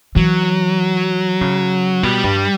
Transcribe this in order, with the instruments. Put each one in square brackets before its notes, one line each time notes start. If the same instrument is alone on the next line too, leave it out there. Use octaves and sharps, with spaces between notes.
[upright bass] E3 [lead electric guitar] F#3
[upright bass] C#3
[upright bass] B2 [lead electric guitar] G3
[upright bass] G2